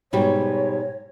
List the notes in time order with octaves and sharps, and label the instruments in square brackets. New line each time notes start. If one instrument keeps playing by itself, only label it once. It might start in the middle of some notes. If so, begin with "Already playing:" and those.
[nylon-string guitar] G#2 B2 G3 [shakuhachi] C#5